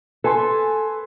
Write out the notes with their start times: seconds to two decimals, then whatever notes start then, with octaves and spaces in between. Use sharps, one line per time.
0.24 A4 B4 G#5 C6